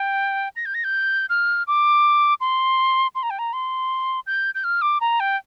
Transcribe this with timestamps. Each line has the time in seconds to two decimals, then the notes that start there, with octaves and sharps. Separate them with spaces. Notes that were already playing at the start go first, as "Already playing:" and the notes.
Already playing: G5
0.56 A#6
0.66 G6
0.74 A#6
0.84 G6
1.29 F6
1.67 D6
2.41 C6
3.15 C6
3.23 A#5
3.30 G5
3.39 A#5
3.53 C6
4.27 G6
4.55 G6
4.64 F6
4.82 D6
5.01 A#5
5.20 G5